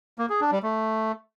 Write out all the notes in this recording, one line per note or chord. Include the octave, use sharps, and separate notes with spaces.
A#3
G#4
D4
G3
A3